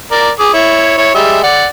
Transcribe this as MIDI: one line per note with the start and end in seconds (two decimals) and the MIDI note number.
0.11 0.30 70
0.11 0.30 74
0.39 0.49 68
0.39 0.49 86
0.54 0.94 64
0.54 0.94 73
0.98 1.14 64
0.98 1.14 73
1.15 1.41 55
1.15 1.41 56
1.15 1.41 76
1.43 1.66 74
1.43 1.66 78